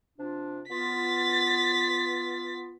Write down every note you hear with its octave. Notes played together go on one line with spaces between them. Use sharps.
C3 D4 F4
B3 F4 A6 B6